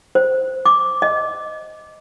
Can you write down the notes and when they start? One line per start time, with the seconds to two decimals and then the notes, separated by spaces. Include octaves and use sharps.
0.15 C5
0.66 D6
1.02 D#5